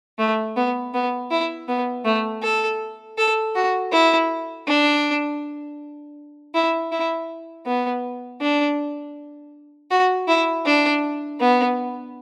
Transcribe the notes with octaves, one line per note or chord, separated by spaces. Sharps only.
A3
B3
B3
E4
B3
A3
A4
A4
F#4
E4
D4
E4
E4
B3
D4
F#4
E4
D4
B3